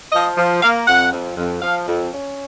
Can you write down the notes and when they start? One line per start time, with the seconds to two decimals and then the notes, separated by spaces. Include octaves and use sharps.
0.12 F3 D#5
0.37 F3
0.63 A#3 F5
0.87 F2 F#5
1.12 F2
1.37 F2
1.62 F3 F5
1.88 F2
2.12 C#4